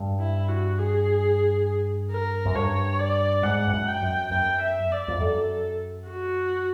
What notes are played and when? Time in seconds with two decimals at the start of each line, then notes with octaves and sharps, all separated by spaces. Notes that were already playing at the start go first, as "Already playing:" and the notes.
Already playing: G2
0.20 E4
0.48 F#4
0.78 G#4
2.10 A#4
2.45 F#2
2.55 G2 C#5
2.99 D5
3.43 G#2 F#5
3.68 G2
3.73 F#2
3.87 G5
4.02 F#2
4.31 F#2 G5
4.61 E5
4.91 D5
5.08 F2
5.20 F#2 A4
6.08 F#4